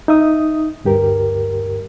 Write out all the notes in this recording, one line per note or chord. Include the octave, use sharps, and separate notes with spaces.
D#4 E5 D#6
D2 G2 G4 A#4